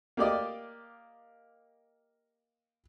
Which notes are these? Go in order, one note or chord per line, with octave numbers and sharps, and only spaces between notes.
A#3 G4 D5 D#5